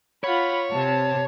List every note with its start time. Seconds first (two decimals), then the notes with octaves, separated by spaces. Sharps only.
0.24 F4 C#5 F#5 B5
0.72 C3 A5